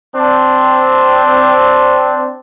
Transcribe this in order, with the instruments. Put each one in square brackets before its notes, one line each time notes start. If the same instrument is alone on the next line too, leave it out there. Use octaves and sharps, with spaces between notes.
[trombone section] C4 D4